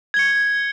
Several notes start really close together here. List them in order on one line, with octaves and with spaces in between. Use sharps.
G#6 G7 C#7